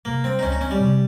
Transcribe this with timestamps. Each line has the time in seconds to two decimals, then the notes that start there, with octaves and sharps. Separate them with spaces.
0.05 C3 A#3
0.24 G3 C4
0.39 D#4
0.43 C#2 C#4
0.52 D#4
0.61 C4 C#4
0.71 G3
0.80 C3